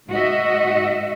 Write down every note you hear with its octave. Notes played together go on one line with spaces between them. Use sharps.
G#2 F#4 D#5 E5